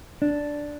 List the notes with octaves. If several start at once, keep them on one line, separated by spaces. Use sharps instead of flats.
D4